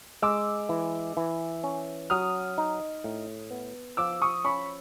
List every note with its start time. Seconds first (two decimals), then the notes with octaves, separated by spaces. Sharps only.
0.22 G#3 D6 E6
0.69 E3
1.17 E3
1.64 C#4
2.10 F#3 D#6 F6
2.58 D#4
3.04 A2
3.51 B3
3.97 F3 D6 E6
4.22 C#6 D#6
4.45 C#4 B5 C#6